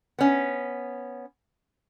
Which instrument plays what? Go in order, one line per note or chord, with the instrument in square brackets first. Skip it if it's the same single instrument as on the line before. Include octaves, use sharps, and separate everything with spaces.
[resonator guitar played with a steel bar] B3 C#4